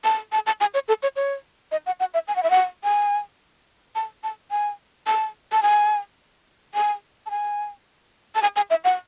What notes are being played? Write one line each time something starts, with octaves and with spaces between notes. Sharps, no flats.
A5
A5
A5
G#5
C#5
A4
C#5
C#5
D#5
F#5
F#5
E5
G#5
F#5
E5
F#5
G#5
A5
A5
G#5
A5
A5
G#5
G#5
A5
G#5
A5
G#5
G#5
E5
F#5